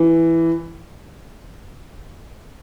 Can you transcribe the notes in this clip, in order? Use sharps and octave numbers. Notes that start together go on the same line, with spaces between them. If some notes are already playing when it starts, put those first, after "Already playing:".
Already playing: E3